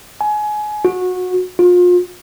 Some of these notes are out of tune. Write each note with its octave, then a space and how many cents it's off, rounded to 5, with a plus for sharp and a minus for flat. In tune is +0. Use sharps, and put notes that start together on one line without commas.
G#5 +25
F#4 -20
F4 +35